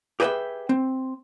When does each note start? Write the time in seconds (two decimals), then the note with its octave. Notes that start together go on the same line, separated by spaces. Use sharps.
0.20 G4 G#4 B4 D#5 E5 G5
0.69 C4